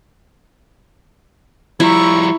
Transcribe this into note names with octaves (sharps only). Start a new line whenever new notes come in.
F3 G3 E4 A#5 C#6